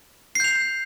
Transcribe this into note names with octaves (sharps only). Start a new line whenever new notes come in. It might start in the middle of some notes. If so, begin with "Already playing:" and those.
G6 C7 F7